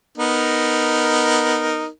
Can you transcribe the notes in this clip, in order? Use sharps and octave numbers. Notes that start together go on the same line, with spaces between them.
B3 D#4 A#4